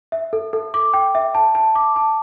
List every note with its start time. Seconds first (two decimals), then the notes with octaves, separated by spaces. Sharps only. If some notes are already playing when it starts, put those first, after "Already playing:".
0.12 E5
0.33 A4
0.53 A4
0.74 D6
0.93 G5
1.15 E5
1.35 A5
1.55 A5
1.75 D6
1.96 A5